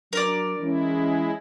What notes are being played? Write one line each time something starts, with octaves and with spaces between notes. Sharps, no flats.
F#3 D4 A#4 D5
E3 G#3 C#4 E4